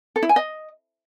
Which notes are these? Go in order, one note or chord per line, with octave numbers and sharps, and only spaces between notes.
A4
E4
G#5
D#5